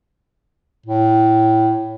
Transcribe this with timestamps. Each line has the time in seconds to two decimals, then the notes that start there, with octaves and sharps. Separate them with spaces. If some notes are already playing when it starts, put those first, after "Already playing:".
0.86 A2